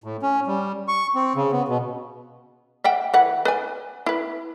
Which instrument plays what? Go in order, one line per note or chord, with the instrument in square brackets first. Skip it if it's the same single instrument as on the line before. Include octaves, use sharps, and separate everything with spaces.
[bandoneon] A2
C#4
G3
C#6
C4
C#3
B3
B2
[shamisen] E5 F#5 G5
E3 B4 F#5
B4 D5 G#5
E4 B4